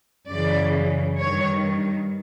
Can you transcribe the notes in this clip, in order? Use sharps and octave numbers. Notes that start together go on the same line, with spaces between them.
F#2 C#3 E3 D5
G2 D#3 C#5